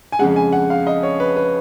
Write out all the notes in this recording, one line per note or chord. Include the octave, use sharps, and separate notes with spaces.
G#5
F2 C#3 G#3 F#5
G#5
F#5
F5
D#5
C#5
B4
B4